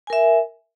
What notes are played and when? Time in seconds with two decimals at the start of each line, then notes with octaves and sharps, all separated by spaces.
0.07 G#5
0.10 A#4
0.13 E5